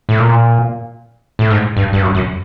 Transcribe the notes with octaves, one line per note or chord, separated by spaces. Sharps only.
A2
A#2
A2
G#2
G2
G2
F#2
F#2